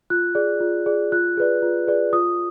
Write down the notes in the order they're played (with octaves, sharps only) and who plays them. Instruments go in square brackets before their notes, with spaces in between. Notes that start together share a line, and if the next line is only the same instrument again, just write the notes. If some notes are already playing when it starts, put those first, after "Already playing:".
[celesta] F4 F#6
G#4 D5
F4
G#4 D5
F4 F#6
G#4 B4 D5
F4
G#4 B4 D5
F4 D#6